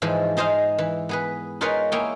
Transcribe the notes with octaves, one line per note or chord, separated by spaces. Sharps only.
G#2 E3 F3 G#4
D#4 G#4 C5 D#5 F5
E3
B3 G#4 B4
D#4 F4 G#4 A#4 B4 C#5
A#3 E4 G#4 C#5 G5